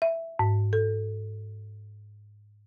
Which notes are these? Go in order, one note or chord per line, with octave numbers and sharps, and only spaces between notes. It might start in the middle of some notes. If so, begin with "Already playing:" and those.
E5
G#2
A4